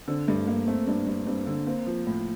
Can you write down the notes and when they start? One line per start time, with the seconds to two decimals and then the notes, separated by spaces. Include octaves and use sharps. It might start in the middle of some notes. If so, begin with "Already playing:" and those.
0.08 D3 C4
0.28 G2 A3
0.48 G2 A#3
0.67 A3 C4
0.87 G2 D4
1.07 G2
1.27 G2 C4
1.47 D3
1.66 A#3 C4
1.87 F3
2.06 A2